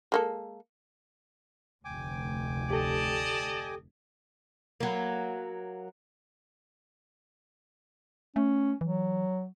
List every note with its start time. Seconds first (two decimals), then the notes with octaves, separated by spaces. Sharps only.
0.12 G#3 A#3 A4
1.85 F1 D2 G5 G#5 D6
2.70 G4 A4 D5 D#5 A5
4.80 F#3 A#3
8.36 A3 C#4
8.81 E3 F#3